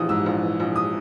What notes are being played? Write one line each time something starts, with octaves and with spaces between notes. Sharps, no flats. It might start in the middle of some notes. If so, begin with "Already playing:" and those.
Already playing: A#1 E3 D#6
G#2 E6
A#1
E3
A#1
D#6